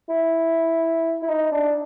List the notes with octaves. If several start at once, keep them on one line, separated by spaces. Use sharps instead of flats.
E4
E4
D#4
D4